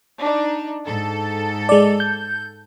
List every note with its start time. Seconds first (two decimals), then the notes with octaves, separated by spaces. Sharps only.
0.20 D4 D#4
0.86 G#2 A4
1.69 G#3 D5
2.00 G6